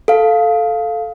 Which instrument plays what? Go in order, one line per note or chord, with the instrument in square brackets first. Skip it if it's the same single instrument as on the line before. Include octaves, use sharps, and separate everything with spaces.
[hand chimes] A4 F5